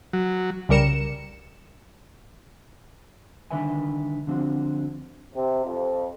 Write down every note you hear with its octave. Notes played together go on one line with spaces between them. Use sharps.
F#3
C2 C#3 G3 A#4 C#7 E7
C2 D3 D#3 B4 E5 G#5
D3 F3 C4 F#4
C3
F2